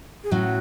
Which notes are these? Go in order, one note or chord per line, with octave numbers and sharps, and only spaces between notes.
G#4
A2 F#3 C#4 F#4